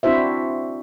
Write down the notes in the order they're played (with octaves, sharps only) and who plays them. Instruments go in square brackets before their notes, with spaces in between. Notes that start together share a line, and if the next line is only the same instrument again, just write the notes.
[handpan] C4 D4 E4 F#4 C5 E5